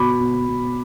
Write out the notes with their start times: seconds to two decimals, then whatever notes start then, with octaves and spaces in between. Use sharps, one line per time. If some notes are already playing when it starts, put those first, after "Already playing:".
Already playing: B2 B5 D6
0.20 B2
0.47 B2